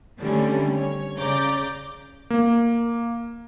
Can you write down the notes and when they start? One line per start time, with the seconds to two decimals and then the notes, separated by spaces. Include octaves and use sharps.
0.19 D3 D#3 G3 A3 C4 C#4
0.74 C#5
1.18 C#3 D5 A#5 D6 G6
2.30 A#3